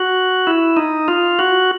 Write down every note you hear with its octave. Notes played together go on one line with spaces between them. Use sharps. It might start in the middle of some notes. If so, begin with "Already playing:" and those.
Already playing: F#4
E4
D#4
F4
F#4